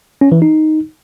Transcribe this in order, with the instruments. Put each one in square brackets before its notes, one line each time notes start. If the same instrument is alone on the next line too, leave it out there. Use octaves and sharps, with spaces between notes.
[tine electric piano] C#4
E3
D#4